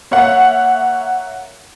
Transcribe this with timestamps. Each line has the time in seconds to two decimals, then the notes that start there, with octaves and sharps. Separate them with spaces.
0.11 A#3 C#5 E5 F#5